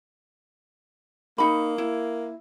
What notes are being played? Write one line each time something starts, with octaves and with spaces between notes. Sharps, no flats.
A#3 D#4 B5
E4